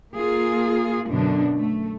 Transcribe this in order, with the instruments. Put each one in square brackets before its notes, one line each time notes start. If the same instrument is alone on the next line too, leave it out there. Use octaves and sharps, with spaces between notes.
[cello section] A#3 F4 G#4
F#2 B2 D3 D4
A3